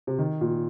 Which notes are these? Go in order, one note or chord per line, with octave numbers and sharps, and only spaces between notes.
C3
D#3
A#2